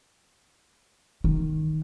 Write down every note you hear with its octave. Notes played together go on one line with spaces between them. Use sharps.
D#3